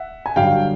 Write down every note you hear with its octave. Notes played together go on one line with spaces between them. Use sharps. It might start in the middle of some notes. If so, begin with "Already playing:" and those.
Already playing: E5 F#5
G#5
G2 D3 F#3 F5 G5